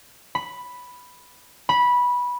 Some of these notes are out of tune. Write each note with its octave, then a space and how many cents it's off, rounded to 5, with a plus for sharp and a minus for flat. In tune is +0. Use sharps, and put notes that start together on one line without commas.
B5 +0
B5 -15